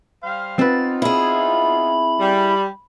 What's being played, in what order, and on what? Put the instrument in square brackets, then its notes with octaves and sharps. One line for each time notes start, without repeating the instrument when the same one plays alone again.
[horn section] G3 C5 F5
[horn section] B3 D#4 F4 [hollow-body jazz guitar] C4 B4 [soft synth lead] A6
[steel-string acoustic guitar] E4 G#4 [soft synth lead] B5
[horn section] G3